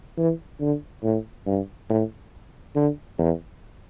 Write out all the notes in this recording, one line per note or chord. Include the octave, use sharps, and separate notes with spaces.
E3
D3
A2
G2
A2
D3
E2